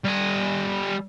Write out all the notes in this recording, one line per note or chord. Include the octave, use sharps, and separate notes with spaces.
G3 G#5